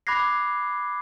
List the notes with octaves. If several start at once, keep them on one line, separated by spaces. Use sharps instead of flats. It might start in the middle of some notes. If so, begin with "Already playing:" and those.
B5 D6 F#6 G#6 A#6 C7